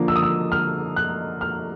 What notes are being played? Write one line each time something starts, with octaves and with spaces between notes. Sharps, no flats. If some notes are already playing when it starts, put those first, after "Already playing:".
Already playing: D3 F3 A#3
E6
D#6
E6
F6
F#6
F6